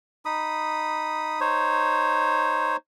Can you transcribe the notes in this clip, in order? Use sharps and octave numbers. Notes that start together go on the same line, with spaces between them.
D#4 B5 D#6
D#4 C5 C#5